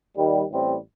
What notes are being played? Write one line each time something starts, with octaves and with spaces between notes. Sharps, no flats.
D#2 D#3 G3
A1 A2 G3 C4